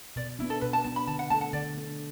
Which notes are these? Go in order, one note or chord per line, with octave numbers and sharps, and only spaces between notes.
B2 D5
B3 D4 E4
A4
B2 B4
A5
B3 D4 A5
B5
D3 A5
F#5
A3 D4 A4 A5
F#5
D3 D5
A3 D4 A4